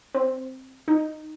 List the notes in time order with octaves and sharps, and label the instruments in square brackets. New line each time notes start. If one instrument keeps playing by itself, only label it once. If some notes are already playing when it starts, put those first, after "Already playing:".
[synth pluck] C4
D#4